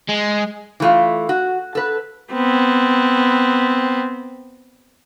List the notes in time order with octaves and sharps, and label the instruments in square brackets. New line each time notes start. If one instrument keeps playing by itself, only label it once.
[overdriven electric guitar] G#3
[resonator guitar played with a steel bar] E3 A3 F4
F#4
A4 B4
[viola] B3 C4